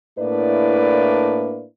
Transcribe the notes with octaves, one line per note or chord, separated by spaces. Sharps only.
A2 A#3 D4 E4 B4 D5